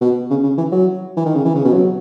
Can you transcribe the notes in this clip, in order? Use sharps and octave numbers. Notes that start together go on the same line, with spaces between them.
B2
C#3
C#3
E3
F#3
E3
D#3
C#3
E3
C#3
B2
F#3